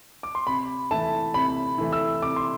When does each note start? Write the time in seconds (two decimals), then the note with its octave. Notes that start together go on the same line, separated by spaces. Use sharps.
0.23 D6
0.35 C6
0.47 C3 B5
0.91 E3 A3 E4 A5
1.34 C3 B5
1.78 E3 A3 E4
1.92 E6
2.22 C3 D6
2.36 C6